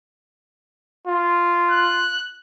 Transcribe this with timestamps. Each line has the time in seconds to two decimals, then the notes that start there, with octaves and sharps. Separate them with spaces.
1.07 F4
1.71 F#6